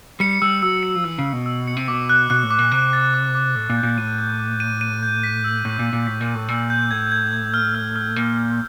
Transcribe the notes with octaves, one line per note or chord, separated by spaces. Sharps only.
G3 C#7
G3 E6
F#3 E6
C#7
F3
E3 E6
C#3
E6
B2
E6
C#7
C3
B2 D6
F#6
B2 F#6
A2
D6
A#2
C3 F#6
A6
D6
D6
A2 D6
A#2
G6
A#2
A2 D#7
G6
D6
D#7
D#7
G6
B6
E6
A2 G6
A#2
D#7
A#2
A2 B6
A#2
D#7
A2
A#2 E6
G6
A2 G#6
G#6
G#6
F6
F6
F6
A#2 G#6
F6